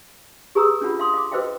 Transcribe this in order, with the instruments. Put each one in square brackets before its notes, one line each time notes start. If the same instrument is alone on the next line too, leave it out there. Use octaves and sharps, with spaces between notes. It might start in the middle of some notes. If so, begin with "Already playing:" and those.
[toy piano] G4 G#4 B4 A#5 D#6 E6
C#4 D4 F4 F#4 F#5 B5
F5 C6 D#6
F5 D6
F#4 B4 C5 D#5 F5 G5